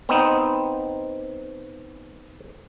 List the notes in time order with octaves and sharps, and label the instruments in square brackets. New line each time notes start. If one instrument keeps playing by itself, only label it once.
[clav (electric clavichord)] B3 C4 D#4